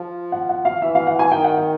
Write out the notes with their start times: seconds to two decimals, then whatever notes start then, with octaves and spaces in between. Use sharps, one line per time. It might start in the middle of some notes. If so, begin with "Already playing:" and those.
Already playing: F3
0.32 F#5
0.49 F#5
0.65 F5
0.82 E3 E5
0.95 F5
1.07 F#5
1.19 G#5
1.31 D#3 G5
1.44 F#5
1.57 G5